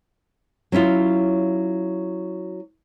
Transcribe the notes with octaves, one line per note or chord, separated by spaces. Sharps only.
F#3 C#4 E4 F4